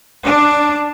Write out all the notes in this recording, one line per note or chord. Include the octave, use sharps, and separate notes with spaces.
D4